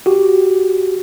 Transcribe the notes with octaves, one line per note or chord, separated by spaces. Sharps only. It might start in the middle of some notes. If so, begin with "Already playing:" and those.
F#4 G4